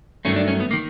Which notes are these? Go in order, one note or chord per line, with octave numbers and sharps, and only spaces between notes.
G2 D#3 F#3 A3 C#4
D4
C#4
B3
D#3 A#3